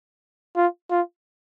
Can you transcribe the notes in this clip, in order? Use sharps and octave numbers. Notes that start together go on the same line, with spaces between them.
F4
F4